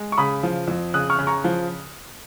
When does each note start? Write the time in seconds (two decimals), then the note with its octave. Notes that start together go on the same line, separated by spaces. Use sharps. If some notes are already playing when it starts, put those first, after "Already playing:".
Already playing: G#3
0.12 C#6
0.17 C#3 B5 D#6
0.43 F3
0.68 F2
0.94 C#3 D#6 F#6
1.10 C#6 F6
1.19 C#3
1.27 A#5 C#6
1.44 F3